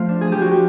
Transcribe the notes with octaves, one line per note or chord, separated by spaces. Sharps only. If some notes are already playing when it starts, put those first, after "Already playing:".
Already playing: F3 A3 F4
D4
G#4
F3 G4
F#4
G4